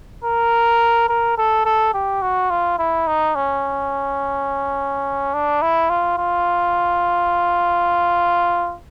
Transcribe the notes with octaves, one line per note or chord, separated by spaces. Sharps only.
A#4
A#4
A4
A4
G4
F#4
F4
E4
D#4
C#4
D4
E4
F4
F4